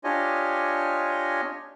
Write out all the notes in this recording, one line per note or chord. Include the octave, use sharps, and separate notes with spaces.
D4 F4 G4 C#5 D#5 G#5